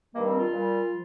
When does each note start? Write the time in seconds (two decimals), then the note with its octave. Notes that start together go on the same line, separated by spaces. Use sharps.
0.14 G2 D#3 G3 A#3
0.26 C4
0.39 F4
0.49 A#2 G3
0.89 F3